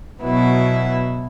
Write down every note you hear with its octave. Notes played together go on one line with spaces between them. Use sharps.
B2 F#3 B3 E4